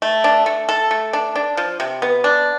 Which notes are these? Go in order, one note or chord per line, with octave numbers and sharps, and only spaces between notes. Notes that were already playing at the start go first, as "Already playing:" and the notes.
A3
D4
A3
A4
A3
D4
D4
F3
C3
B3
D4